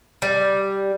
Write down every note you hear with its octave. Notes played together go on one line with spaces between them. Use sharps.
G3